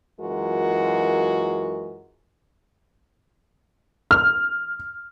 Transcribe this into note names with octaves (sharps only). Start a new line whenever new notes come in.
F#2 E3 G#3 F4 F#4 A#4
F6